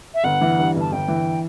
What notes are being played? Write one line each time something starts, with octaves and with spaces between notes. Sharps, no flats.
E5
G1 F#5
E3
G2
G1
A5
G1 G5
E3